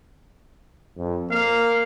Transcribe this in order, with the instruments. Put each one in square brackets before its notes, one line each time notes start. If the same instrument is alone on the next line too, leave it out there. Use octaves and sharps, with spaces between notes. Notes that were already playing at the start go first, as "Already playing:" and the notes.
[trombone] F2
[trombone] A#3 [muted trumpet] F5